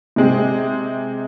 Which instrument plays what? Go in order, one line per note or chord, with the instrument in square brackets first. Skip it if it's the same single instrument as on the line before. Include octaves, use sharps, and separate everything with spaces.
[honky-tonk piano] C3 G#3 C4